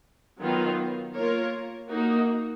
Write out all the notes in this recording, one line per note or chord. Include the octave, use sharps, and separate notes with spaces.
D#3 F#3 B3 F4
A#3 F4 A#4 C#5
A#3 D#4 F#4